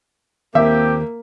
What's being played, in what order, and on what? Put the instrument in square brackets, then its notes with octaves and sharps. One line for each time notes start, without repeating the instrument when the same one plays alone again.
[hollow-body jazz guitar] D#2 [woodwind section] F3 C4 G4 [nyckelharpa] A#3 [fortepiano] E5